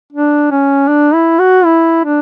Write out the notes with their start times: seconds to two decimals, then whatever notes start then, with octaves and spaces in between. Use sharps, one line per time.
0.13 D4
0.51 C#4
0.88 D4
1.14 E4
1.40 F#4
1.65 E4
2.04 D4